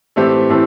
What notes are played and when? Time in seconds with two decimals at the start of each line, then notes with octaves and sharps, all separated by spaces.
0.16 A2 E3 A3 C4 G4
0.50 A2 E3 A3 C4